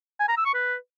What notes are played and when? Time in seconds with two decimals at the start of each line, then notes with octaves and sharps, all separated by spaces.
0.20 G#5
0.28 A#5
0.37 E6
0.45 C#6
0.54 B4